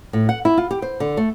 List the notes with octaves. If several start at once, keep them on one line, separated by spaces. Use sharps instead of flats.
A2
F#5
E4
F4
G4
C5
D3
A3